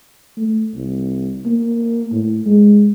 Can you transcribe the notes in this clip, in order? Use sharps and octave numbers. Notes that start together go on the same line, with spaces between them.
A3
C2
A#3
A2
G#3